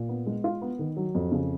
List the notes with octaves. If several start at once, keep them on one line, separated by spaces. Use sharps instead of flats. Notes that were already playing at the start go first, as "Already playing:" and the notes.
Already playing: A#2
B3
G#3
F4
B3
D#3
F#3
F2
C#3